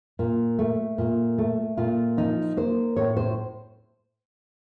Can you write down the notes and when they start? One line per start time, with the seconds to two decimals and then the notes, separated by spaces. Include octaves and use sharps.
0.19 A#2
0.59 A3
0.98 A#2
1.38 A3
1.77 A#2 F4
2.17 F3 D#4
2.57 A#3 C5
2.96 A2 C#5
3.17 C5